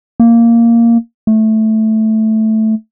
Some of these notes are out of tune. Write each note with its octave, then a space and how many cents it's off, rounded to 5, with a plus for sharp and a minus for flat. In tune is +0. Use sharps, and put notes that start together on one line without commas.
A#3 -5
A3 -5